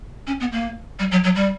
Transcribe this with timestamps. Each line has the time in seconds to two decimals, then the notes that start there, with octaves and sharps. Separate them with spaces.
0.27 C#4
0.40 B3
0.52 A#3
0.99 G3
1.11 F#3
1.24 F#3
1.35 G3